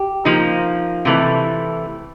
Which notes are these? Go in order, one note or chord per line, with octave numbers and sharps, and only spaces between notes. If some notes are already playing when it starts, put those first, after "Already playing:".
Already playing: G4
F3 A#3 D#4
C3 E3 A3